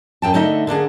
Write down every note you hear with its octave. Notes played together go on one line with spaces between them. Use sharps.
F#2 G5 A5
D3 A3 D#4 D#5 E5
D3 A#3 D4 G#4